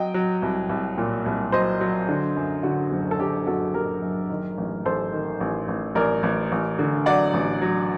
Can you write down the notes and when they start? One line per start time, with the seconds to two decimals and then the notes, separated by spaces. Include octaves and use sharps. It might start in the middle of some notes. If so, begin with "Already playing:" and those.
Already playing: F#3 D#5 G5
0.14 F#3
0.42 C2
0.69 C2
0.98 A#2
1.26 C2
1.52 F#3 C5 D#5
1.81 F#3
2.09 D3
2.36 F#2
2.63 D3 F#4
2.92 F#1
3.11 A4
3.19 D3 G4
3.47 F#1 F#4 A4
3.74 F#1 G4 A#4
4.02 F#2
4.30 D#3
4.58 A1
4.85 A1 A4 C5
5.13 D#3
5.40 A1
5.68 A1
5.95 A1 A#4 D5
6.23 A1
6.52 A1
6.79 D3
7.06 F#3 D5 F#5
7.34 A1
7.61 F#3